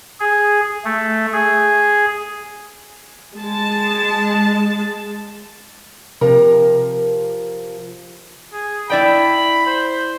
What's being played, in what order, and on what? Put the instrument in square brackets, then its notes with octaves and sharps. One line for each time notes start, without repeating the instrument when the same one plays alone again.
[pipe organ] G#4
A3
G#4
[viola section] G#3 A5
[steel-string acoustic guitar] C3 F3 A#4 A#5
[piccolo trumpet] G#4
[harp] E4 D5 G5 [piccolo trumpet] B5
[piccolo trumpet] C5